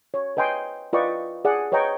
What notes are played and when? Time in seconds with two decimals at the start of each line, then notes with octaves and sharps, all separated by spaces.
0.14 C#5
0.37 B4 D#5 G5 G#5 C6
0.93 F4 B4 D5 D#5 G5 C#6
1.45 G#4 D5 F#5
1.72 B4 C#5 D#5 G5 A#5 C#6